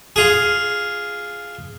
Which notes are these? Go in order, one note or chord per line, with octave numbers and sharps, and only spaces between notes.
F4 G#4